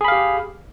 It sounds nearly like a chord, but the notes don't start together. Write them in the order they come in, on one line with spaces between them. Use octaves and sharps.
G#4 B5 F5 G4